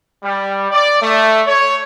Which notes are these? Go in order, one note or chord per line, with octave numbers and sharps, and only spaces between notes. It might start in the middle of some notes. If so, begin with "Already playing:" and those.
G3
D5
A3
C#5